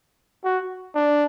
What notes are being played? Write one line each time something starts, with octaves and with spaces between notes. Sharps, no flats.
F#4
D4